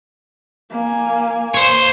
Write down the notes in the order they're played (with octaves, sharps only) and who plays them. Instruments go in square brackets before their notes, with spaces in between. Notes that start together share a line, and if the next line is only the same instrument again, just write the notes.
[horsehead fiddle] A#3 G#5
[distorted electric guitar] C5 C#5